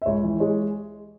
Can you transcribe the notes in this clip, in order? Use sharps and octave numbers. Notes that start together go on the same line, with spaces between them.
E5
C#2 C#5
E3
G#3 C#5